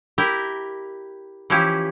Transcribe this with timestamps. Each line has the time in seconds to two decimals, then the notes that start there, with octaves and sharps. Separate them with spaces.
0.18 E4 G4 A#4
1.50 E3 F3 C#4 E4 G4